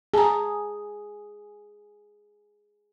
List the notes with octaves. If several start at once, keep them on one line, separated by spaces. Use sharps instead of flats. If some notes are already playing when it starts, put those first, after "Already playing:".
G#4 A5 A#5